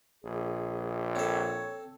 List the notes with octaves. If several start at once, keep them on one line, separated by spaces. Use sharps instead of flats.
A#1 G#4
C4 A4 C#5